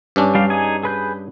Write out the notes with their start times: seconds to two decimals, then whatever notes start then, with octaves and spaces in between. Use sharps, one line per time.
0.16 G2 C#4 D4
0.35 G3 G4 F5
0.50 D#4 G#4 G#5
0.83 G#4 B4 G6